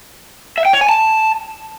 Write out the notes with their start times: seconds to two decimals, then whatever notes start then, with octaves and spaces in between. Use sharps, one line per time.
0.58 E5
0.65 G5
0.73 C#5
0.81 G#5
0.89 A5